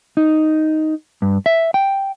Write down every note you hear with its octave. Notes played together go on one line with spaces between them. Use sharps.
D#4
G2
E5
G5